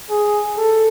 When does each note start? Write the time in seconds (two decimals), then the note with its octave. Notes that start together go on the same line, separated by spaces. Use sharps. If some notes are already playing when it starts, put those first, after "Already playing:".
0.10 G#4
0.57 A4